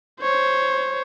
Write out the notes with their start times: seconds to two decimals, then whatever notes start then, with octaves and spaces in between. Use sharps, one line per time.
0.21 C5 C#5